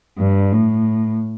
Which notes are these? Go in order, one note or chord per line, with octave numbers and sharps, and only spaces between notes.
G2
A2